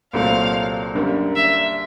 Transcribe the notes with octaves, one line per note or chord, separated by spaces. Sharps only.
C2 A#2 F#3 A3 C4 F5
F#2 D3 G3 A#3
E5